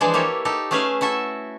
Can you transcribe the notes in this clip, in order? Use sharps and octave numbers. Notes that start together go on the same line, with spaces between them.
E3 F3 G#3 D4 G#4 C5
A#3 E4 G4 A4 C#5
D#4 G4 A4
A3 C#4 G#4 B4 E5 F5
E4 F#4 A4 E5